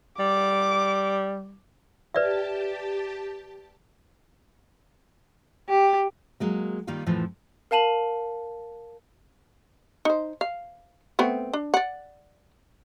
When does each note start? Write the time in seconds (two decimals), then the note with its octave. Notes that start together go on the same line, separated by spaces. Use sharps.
0.20 G3 D6
2.15 G4 B4 D5 E5 A5
5.69 G4
6.40 F#3 G#3 A#3
6.87 D#3 G3 A#3 D#4 F4
7.06 F2 A2 E3 F3
7.71 A#4 F5 A5 D#7 F#7
10.05 D#4 C5
10.41 F5
11.19 A3 B3 C4
11.53 D4
11.74 D5 F#5